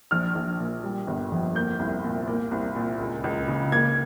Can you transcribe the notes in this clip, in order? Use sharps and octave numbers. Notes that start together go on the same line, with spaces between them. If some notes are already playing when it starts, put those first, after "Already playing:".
A#1 F6
A#1
A#2
G3
G1
F2
A#3 G6
C2
A#2
A#3
C2
A#2
C#2
C#2
C#3
A#3 G#6